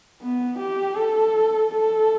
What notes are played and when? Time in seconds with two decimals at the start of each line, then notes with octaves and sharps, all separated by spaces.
0.22 B3
0.59 G4
0.96 A4
1.70 A4